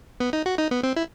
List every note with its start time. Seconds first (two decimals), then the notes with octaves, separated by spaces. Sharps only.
0.20 B3
0.33 D#4
0.46 F#4
0.58 D#4
0.71 B3
0.83 C4
0.96 E4